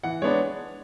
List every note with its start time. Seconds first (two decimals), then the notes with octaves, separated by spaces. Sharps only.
0.04 E3 F#5
0.22 G#3 B3 D4 C#5